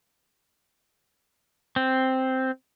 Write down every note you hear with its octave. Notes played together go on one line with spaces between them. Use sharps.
C4